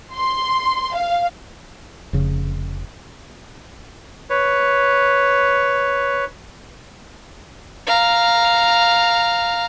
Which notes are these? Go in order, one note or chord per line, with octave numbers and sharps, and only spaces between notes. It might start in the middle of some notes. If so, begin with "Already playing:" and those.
C6
F5
F1 C#3
B4 C#5
F5 A#5